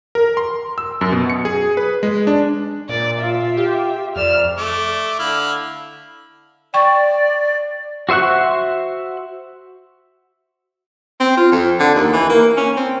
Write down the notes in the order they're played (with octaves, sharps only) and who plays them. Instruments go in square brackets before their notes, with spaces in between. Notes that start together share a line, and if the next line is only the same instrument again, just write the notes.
[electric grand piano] A#4
C6
E6
F#2
B2
C#7
G#4
B4
G#3
D4
[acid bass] A#2 [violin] D5
[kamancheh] F4 [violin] E5
[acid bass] G4
[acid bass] F2 [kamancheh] D5 [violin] F6 E7
[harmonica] A3 D6
D3 E4 F5
[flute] D5 [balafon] G5 C#6
[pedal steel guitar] F#4 C5 E5 C#6 F#6
[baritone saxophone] C4
F4
F2
D3
D#2
E3
A#3
C#4
C4